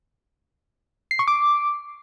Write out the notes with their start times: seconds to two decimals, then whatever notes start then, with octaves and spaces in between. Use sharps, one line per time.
1.11 C7
1.19 C#6
1.28 D6